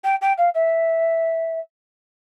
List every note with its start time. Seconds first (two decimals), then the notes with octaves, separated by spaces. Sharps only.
0.04 G5
0.22 G5
0.38 F5
0.55 E5